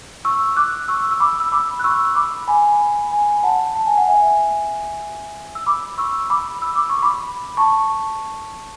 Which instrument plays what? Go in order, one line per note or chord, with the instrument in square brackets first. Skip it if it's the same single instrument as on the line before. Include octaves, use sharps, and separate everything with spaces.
[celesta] C#6 E6
D6 F#6
C#6 E6
E6
B5 D6
E6
B5 D6
F#6
C#6 E6
B5 D6
G#5 B5
G#5 B5
F#5 A5
A5
G#5
F#5
E5 G#5
E6
B5 D6
C#6 E6
B5 D6
E6
D6
C#6
B5 D6
A5 C#6